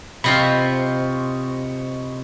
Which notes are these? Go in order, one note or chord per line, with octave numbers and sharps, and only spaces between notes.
C3 C4 F4 C5 D#5 B5 C#6